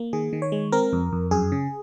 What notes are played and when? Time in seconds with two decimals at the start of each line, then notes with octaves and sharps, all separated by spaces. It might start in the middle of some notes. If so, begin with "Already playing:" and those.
Already playing: A#3
0.13 D#3 G#4
0.33 D#3
0.42 C#5
0.52 G#3
0.72 C4 A#4
0.93 F2
1.13 F2
1.31 F#2 G#4
1.52 C#3